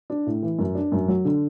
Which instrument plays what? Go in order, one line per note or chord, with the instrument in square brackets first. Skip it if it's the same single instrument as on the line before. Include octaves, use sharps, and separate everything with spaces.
[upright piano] D4
A2
E3
F#2
D4
F#2
F#3
D3